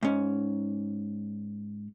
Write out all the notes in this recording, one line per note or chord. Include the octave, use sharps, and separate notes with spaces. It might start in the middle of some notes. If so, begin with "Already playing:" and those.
G#2 C#4